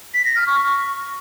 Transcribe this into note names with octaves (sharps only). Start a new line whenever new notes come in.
B6
A#6
F6
C#6